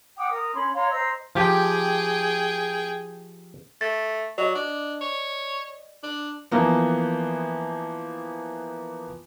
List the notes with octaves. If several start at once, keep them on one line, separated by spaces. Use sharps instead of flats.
F#5 G5 D6 D#6
A#4 D#6
C#4 B5 C6
C#5 F5 A#5 C6
C5 D#5 A#5 E6
F3 G4 G#4 G5
A3 A6
F#3 D5 D#5
D4
C#5
D4
E3 F3 A#3 B3